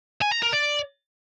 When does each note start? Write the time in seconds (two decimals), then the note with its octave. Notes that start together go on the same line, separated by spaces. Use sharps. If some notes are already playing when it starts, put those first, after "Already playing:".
0.22 G#5
0.32 A#5
0.42 A#4
0.53 D5